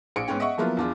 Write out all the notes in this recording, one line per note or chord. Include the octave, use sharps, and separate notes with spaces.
A#1 C#7 D7
G#2 B3 C#4 G5
D#5 E5 F#5 C#6
F3 F#3 A#3 B3 E4 F4
E2 D4 F4